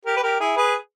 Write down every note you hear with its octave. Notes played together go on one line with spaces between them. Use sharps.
G4 A#4
B4
G4 A#4
E4 G#4
G#4 B4